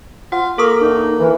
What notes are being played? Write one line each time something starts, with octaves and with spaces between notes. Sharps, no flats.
F4 F#5
A#3 A4 A#4 C#6 D#6
E2 D4 D#4
E3